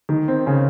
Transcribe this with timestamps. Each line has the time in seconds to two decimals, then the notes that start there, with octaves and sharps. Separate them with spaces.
0.09 D#3 D#4
0.28 C4
0.46 C#3 C#4